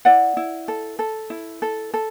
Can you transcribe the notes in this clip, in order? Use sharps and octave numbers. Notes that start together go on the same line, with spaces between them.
E4 D5 F#5
E4
A4
A4
E4
A4
A4